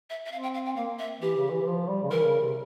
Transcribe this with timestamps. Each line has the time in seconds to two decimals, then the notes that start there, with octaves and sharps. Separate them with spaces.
0.10 E5
0.25 E5
0.32 C4 F5
0.43 G5
0.54 F5
0.66 G5
0.76 A#3 F5
0.99 E5
1.21 E3 G4
1.37 C#3
1.51 E3
1.62 E3
1.66 F3
1.88 G3
2.03 C#3
2.11 E3 A#4
2.26 C#3
2.40 C3